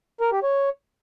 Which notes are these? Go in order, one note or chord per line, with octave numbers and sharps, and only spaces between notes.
A#4
G4
C#5